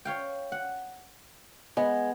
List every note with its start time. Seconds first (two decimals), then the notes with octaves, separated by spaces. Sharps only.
0.05 C#5 F5 G5
0.52 F#5
1.77 G#3 B3